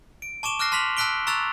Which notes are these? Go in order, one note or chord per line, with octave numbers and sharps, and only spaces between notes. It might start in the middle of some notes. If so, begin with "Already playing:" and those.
D7
A5 C#6 D6 E7 G7
D6 F6 F#6 A#6 C7
A5 C6 F6 B6 F7 F#7
A5 E6 F#6 B6 D7 G7
A#5 C#6 E6 F#6 A6 F7